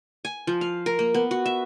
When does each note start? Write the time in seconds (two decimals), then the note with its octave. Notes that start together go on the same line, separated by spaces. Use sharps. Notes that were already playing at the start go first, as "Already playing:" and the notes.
0.25 G#5
0.47 F3
0.61 F5
0.86 A#4
0.99 A#3
1.14 B3
1.31 F#4
1.46 E5